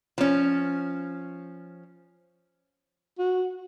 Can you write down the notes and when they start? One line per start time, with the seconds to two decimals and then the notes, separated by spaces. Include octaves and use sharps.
0.18 F3 C#4
3.19 F#4